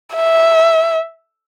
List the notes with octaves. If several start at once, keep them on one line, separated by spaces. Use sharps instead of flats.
E5